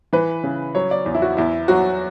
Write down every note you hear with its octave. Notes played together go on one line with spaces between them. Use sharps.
E3 B4
C#3
F#3 C#5
D5
E2
E4
F#4
E2 E4
F#3 F#4